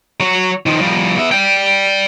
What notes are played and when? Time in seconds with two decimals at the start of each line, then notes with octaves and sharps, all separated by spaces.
0.20 F#3 C#5
0.66 D#3 F3
0.81 F3 G3
1.18 B3 E5
1.32 D5 G5